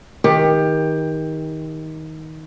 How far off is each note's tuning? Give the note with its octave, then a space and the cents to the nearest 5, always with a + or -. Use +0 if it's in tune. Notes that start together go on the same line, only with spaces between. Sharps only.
D#3 +20 G4 +20